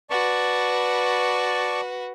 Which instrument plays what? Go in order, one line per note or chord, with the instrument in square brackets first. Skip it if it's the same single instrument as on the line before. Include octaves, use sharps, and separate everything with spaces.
[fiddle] F#4 B4 [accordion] D5 A5 C#6